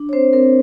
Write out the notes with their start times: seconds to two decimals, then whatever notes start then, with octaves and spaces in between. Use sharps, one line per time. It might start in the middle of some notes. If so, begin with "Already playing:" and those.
Already playing: D4
0.09 C#5
0.13 C4 C5
0.33 C4 A#4